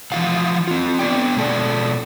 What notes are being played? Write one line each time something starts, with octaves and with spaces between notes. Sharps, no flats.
E3 F3 F5 F#5
C4 F4
B3 D4 D5 G5
B2 G#3 A4 D5